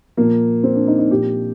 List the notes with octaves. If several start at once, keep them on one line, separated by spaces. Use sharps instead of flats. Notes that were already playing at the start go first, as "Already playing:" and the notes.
A#2 F3 A#3
C4
D4
D#4
D#4
A#2 F3 G4